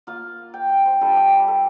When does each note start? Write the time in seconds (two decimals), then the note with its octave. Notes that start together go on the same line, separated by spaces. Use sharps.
0.07 A#3 F4 F5
0.54 G5
0.70 G5
0.86 C5
1.01 G3 D4 F4 A4
1.16 G4
1.48 A4